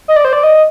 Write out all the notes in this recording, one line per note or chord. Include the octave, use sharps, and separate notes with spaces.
D#5
D5
C5
D5
D#5